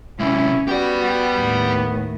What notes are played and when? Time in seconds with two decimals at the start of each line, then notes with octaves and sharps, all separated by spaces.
0.20 C3 G#3 C#4 E4
0.68 B3 F#4 G4 D5
1.37 D#2 A2